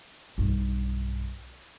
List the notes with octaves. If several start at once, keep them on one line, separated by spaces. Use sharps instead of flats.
B1 G2